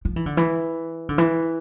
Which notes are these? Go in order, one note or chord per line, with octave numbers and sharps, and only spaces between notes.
F3
E3
D3
E3
D3
E3